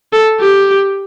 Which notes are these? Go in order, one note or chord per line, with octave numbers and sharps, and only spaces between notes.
A4
G4